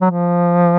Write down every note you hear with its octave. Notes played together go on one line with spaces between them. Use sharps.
F#3
F3